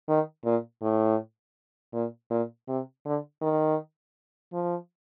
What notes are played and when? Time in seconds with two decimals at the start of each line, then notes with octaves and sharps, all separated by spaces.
0.08 D#3
0.45 A#2
0.82 A2
1.93 A#2
2.30 A#2
2.68 C3
3.05 D3
3.42 D#3
4.53 F3